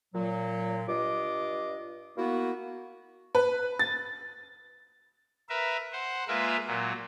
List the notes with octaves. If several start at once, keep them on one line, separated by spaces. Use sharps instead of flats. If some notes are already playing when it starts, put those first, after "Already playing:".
A#2 F#3
G2 F4 D#5 D6
A#3 B3 E4 F#4
B4
A6
A#4 B4 E5
C5 F#5
G#3 A#3 F4 A#4 B4 E5
A#2 F#3